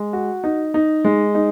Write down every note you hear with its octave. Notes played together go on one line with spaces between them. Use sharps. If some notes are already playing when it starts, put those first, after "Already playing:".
Already playing: G#3
F#4
D#4
D#4
G#3
D#4